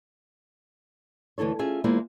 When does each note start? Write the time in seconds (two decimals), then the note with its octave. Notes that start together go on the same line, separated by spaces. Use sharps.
1.38 D2 E3 E4 A4 C#5
1.59 C#4 F4 G#4 E5
1.84 E2 G#3 A#3 E4 F4 C5